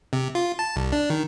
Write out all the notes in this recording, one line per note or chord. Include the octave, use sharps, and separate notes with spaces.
C3
F4
A5
C2
D4
D#3